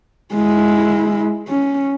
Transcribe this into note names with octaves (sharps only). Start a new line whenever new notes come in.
G#3 E4
C#4